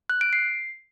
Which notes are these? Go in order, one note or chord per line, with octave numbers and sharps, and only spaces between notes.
F#6
D7
C7